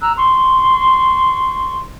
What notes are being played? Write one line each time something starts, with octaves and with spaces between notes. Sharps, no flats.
A#5 E6 F#6
C6 C#6